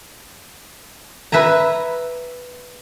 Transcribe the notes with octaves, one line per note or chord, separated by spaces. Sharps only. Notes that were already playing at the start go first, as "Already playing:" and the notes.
B4 E5 G#5 A#5